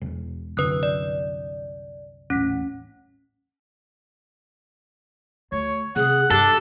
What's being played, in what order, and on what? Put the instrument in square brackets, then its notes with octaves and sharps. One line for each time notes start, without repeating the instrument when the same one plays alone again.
[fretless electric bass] E1
[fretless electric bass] C2 F#2 D3 [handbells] B4 D#6 F#6
[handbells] D5
[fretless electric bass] D#1 A1 [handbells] C#4 B6
[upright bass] D2 [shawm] C#5
[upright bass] C3 [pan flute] G#4 [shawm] F#5
[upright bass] G2 [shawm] D4 [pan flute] G4 [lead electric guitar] A4